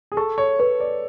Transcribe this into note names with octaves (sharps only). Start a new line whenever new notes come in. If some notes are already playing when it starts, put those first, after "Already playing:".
G#4
A4 C#6
C#5
B4 C#5
D5